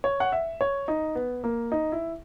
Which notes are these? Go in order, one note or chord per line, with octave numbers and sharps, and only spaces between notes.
C#5
F#5
E5
C#5
D#4
B3
A#3
D#4
E4